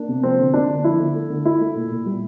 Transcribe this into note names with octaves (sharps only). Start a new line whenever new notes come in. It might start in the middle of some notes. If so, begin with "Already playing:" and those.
Already playing: A#3 D4
C3
F3 C4
D3
A#3 D4
D3
F3 E4
D3
A3
D3
A3 E4
A3
A#2
A#2
G3